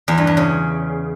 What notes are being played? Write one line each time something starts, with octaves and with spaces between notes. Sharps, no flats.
E2
G2
E2
C#3